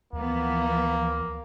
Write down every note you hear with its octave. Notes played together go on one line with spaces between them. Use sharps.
D2 E3 F3 A#3 B3